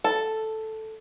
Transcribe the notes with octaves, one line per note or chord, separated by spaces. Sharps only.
A4